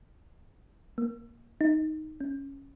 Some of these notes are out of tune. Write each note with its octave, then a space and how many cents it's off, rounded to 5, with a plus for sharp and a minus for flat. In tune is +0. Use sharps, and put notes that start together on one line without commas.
A#3 +0
D#4 +0
C#4 -5